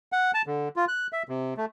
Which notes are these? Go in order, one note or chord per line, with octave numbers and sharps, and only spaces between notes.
F#5
A5
D3
F4
F#6
E5
C3
A3